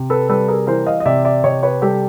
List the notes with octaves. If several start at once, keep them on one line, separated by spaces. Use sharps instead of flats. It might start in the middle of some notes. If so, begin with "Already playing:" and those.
Already playing: C3
A4 B4
G3 A4 B4
G#4 A#4
E3 A#4 C5
D#5 F5
D#5
C3 D5 E5
D5 E5
C3 C#5 D#5
B4 C#5
G3 G4 A4